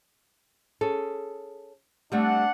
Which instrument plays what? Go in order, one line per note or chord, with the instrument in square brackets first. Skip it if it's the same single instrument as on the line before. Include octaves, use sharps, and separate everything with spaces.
[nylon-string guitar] C#4 G#4 A4
[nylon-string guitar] G3 A3 C4 [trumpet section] D4 F#5